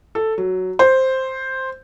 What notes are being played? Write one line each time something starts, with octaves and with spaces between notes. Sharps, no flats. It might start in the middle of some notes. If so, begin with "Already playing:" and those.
A4
F#3
C5